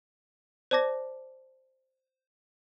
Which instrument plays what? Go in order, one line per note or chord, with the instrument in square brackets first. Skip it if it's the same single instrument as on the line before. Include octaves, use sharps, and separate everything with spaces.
[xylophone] C5 D5 A5 D6 A#6